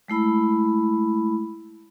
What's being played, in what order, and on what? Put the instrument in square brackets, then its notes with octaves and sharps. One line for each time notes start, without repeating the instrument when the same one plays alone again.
[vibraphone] G#3 A3 E4 B5